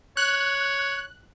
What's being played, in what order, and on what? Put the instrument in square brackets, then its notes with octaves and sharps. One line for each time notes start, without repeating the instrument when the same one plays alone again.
[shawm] C#5 [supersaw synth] F#6